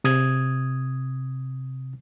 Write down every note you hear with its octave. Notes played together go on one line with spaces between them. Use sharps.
C3 D#6 G#6